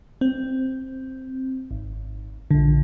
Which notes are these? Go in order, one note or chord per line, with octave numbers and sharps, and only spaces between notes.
C4
G#1
A#1 D3